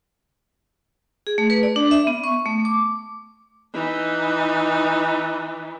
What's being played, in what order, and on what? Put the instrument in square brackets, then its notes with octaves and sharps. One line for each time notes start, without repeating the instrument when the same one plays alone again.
[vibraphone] G#4
A3
B4
D5
D4
E5
B3
C#6
A3
D6
[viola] E3 D#4